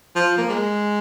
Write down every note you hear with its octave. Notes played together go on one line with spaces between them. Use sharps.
F3
A#3
G#3